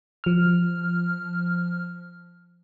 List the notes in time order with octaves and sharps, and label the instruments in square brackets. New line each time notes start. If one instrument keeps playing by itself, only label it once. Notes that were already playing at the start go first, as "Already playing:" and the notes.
[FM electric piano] F3 F6